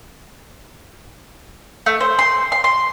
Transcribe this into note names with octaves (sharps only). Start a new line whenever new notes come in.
A3
C5
C6
C6
C6